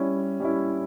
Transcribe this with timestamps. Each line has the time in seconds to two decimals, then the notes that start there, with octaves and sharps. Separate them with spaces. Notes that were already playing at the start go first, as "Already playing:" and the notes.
Already playing: G3 C#4 E4
0.40 G3 C#4 E4